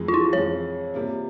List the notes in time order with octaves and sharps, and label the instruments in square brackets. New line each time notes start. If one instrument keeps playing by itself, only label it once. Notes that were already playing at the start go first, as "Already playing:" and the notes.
Already playing: [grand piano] F2 E3 G#3
[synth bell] F4
E4
[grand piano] F2 E3 G#3 [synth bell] C#5
[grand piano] C3 G3 A#3 F4